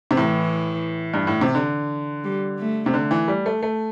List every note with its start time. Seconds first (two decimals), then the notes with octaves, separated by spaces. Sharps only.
0.11 C3
0.16 A2 E3
1.14 G2
1.27 A2
1.41 C3
1.55 D3
2.24 G3
2.59 A3
2.86 C3
2.94 D3
3.11 E3
3.28 G3
3.46 A3
3.62 A3